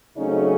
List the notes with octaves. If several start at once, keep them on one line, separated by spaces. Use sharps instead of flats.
C#3 F#3 A3 C4 C#4 D#4